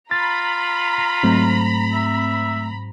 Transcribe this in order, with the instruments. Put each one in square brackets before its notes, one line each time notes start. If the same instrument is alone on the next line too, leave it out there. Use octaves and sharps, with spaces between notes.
[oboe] F4 [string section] A#5 B5 [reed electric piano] A6
[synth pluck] G#2 F#3 C4 [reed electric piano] A3
[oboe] E5